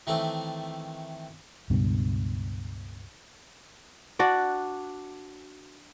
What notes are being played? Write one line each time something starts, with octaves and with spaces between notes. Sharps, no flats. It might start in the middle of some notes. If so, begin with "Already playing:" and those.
D#3 E3 A3 C4 A4
C#2 G2 B2
D4 F#4 D5